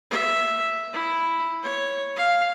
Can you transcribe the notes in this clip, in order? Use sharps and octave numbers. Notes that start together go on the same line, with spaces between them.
E5
E4
C#5
F5